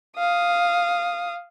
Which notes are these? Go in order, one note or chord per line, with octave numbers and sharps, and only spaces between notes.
F5 D#6